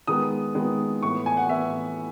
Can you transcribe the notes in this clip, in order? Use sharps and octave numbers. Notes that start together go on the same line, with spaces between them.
D#3 G#3 B3 D#6
D#3 G#3 B3
A2 E3 B3 C#6
G#5
F#5
A2 E3 B3 E5